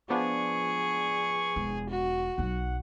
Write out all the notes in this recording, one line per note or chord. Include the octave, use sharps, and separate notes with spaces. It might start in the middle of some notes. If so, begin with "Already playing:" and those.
F3 B3 D4 G#4 C#6
E1
F#4
B1 F#3 F#5